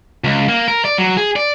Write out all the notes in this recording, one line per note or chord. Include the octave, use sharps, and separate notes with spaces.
C#2
A#3
A#4
D5
F#3
G#4
D5